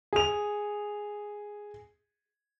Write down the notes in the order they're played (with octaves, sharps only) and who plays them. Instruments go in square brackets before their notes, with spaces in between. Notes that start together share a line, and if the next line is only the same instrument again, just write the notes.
[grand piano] G#4 F7